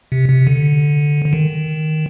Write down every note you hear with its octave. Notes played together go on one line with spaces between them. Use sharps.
C3
C3
D3
D3
D#3